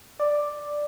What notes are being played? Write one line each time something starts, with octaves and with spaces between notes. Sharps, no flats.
D5